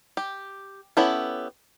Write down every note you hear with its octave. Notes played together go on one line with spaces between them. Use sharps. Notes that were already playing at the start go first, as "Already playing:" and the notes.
G4
B3 C#4 E4 G4 A4